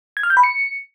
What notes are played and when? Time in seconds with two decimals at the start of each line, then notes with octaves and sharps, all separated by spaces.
0.17 G#6
0.23 F6
0.30 G6
0.37 B5
0.44 C#7